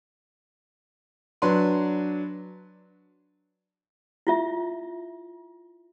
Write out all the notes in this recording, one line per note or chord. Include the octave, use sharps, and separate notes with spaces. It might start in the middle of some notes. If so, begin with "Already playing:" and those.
F#3 D4 B4 C6
E4 F4 E5